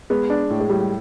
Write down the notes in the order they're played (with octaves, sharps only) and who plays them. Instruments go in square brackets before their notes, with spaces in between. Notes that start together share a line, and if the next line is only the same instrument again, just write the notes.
[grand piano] G#3 [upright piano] B3
[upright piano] D4
A2
[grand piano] G#3
[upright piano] A2 [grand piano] G3
[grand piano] G3